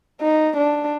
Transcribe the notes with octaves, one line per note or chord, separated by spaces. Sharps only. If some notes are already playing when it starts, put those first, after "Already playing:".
D#4
D4